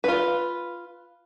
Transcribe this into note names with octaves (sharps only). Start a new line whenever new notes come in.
F4 B4